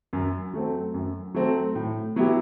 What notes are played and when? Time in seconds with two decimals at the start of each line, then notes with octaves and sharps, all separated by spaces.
0.13 F#2
0.54 F#3 A3 C4
0.94 F#2
1.34 F#3 A3 C4
1.75 A2
2.16 F#3 B3 E4 G4